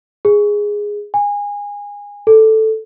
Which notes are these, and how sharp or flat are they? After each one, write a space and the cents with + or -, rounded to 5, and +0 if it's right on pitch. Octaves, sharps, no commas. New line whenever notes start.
G#4 -5
G#5 -25
A4 +0